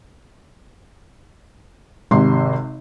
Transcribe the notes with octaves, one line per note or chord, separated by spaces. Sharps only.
G#1 C3 C6